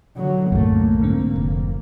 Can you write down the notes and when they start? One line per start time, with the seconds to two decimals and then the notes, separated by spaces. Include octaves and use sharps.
0.16 D3 F#3
0.52 C2 F#2 A2 E3 A3 A#3
1.01 G#2 D3 C4
1.36 F1